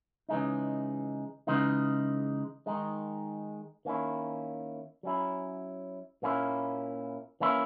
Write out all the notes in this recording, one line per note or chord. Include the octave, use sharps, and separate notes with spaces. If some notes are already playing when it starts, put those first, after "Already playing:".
C#3 E3 G#3 D#4
C#3 E3 G#3 D#4
D#3 G#3 D#4
D#3 A#3 C#4 E4
F#3 C#4 E4
A#2 A#3 C#4 E4
E3 A#3 C#4 E4